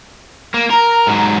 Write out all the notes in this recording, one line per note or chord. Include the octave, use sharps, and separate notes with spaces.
A#3
A#4 A#5
G#2 F#3